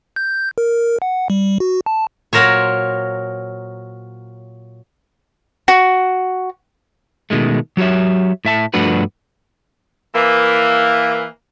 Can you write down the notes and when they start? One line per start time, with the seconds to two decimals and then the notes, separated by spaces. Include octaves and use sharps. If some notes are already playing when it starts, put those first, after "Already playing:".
0.16 G6
0.58 A#4
1.02 F#5
1.30 G3
1.60 F#4
1.86 A5
2.33 A#2 F#3 A#4 C5 C#5
5.68 F#4
7.30 B2 D#3 G#3 A3
7.77 F#3 F#4 G4 C#5 E5
8.45 A2 E5 A5
8.74 G2 F3 A3 D4 F#4 B4
10.15 E3 A#3